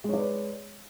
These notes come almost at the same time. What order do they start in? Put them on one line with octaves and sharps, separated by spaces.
G#3 C#5 D5 B4